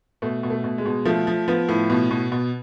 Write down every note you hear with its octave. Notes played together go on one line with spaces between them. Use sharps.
B2 A3
B2
A3
B2
G#3
B2
F3 A3
F3
F3 B3
A2
B2
B2
B2